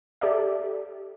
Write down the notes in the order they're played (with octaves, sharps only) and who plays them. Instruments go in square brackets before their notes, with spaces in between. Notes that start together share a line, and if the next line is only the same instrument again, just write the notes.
[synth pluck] G4 A4 D5 E5